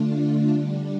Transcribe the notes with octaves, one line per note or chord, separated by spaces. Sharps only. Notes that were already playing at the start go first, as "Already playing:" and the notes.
Already playing: D3 A3 D4 F4
D3 G3 D4